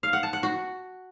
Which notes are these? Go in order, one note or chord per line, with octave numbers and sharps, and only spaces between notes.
F5
F#5
A5
F#5
F#4